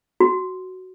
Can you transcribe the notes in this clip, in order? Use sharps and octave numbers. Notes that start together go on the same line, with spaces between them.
F#4